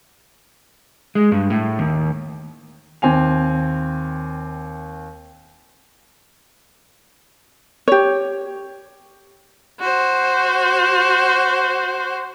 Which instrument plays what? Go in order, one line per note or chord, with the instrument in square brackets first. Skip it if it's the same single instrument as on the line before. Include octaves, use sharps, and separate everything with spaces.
[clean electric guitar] G#3
G2
A2
D#2
[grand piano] D#2 C4 G#5 F7
[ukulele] G4 C#5
[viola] F#4 C5